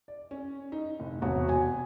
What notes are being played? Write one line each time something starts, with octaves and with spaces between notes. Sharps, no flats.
D5
C#4
D#4
F1
E1 C3 F#4
G#5